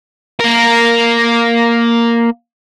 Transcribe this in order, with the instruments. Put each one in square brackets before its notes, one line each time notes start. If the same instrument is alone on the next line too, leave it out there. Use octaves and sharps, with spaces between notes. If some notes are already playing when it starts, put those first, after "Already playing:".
[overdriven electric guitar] A#3 A#4